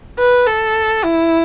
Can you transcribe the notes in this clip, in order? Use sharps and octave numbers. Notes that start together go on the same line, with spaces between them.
B4
A4
E4